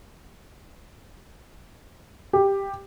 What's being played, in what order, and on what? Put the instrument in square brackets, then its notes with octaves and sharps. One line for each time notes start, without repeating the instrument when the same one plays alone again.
[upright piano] G4